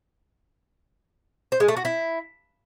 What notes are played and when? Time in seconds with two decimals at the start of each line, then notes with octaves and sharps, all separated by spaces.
1.52 C5
1.60 G#3
1.68 A3
1.77 F#4
1.85 E4